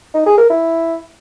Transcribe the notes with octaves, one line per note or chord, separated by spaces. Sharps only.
D#4
G#4
A#4
E4